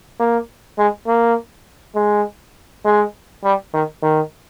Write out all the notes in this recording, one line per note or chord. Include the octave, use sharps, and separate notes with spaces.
A#3
G#3
A#3
G#3
G#3
G3
D#3
D#3